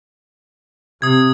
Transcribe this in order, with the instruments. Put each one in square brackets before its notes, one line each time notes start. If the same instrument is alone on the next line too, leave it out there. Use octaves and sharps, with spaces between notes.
[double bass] C3 [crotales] D#6 G#6